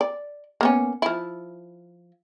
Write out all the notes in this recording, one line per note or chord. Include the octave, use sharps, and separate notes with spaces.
D5
A#3 B3 C#4
F3 E4